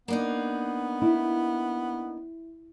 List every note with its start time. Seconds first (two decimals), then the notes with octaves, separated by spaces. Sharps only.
0.08 A#3 B3 D4 D#4
1.02 E4